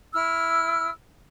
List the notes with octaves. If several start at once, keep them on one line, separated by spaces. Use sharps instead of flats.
E4 E6 F6